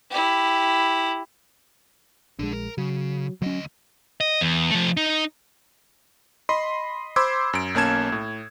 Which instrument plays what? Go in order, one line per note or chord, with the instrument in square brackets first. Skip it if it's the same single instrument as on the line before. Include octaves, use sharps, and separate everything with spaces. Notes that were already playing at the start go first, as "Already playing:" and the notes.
[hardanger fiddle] E4 G4
[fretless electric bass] A#1 G#3 [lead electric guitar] D4 A4
[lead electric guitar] A#4
[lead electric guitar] C#3 [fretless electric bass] F#3
[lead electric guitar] D2 D#5 [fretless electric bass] F#3 C#4
[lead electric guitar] D#5
E2
F3 A3
D#4
[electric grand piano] D#5 B5 C6
C5 B5 C6 D6 E6 G#6
F#2 D7
B1 A#3 C#4 A5 G#6 E7
A2